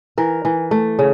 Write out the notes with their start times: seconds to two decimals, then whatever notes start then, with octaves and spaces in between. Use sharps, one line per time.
0.18 E3 A#4
0.45 E3
0.71 A3
0.99 C#3